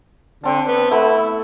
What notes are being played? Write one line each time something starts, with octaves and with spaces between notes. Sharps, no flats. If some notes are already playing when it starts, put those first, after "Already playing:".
D3 C4 A5
B3
A3 B3 E4